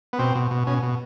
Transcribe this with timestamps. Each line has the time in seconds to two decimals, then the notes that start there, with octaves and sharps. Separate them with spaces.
0.13 B3
0.19 B2 C4
0.35 B2
0.51 B2
0.67 B2 C#4
0.83 B2